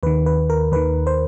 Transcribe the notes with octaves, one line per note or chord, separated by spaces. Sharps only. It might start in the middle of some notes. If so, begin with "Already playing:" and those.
D#2 D#3 B4
B4
A#4
D#2 D#3 B4
C5